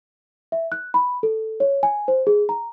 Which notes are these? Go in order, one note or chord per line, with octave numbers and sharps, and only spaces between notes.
E5
F#6
B5
A4
C#5
G#5
C5
G#4
A#5